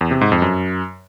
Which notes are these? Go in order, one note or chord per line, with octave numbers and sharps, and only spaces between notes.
E2
C3
G#2
F2
F#2